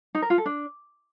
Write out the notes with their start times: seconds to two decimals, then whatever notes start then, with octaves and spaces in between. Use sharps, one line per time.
0.15 D#4
0.22 A#4
0.30 F4
0.38 A4
0.46 D4